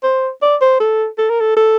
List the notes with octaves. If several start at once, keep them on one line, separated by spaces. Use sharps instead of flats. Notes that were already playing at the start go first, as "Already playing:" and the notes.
C5
D5
C5
A4
A4
A#4
A4
A4